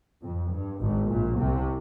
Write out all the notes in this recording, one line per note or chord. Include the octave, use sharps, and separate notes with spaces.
F2
G2
G#1 G#2
A#1 A#2
C2 C3